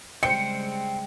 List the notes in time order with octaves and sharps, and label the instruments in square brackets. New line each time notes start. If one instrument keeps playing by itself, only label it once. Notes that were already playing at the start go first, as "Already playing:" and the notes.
[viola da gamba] C#3 G3 G#3 [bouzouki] C4 [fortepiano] C5 G5 [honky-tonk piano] C#7